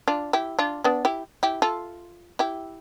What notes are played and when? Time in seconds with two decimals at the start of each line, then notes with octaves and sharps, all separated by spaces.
0.08 D4 F4
0.33 E4 G4
0.59 D4 F4
0.84 B3 D4
1.05 E4 G4
1.43 E4 G4
1.62 F4 A4
2.39 E4 G4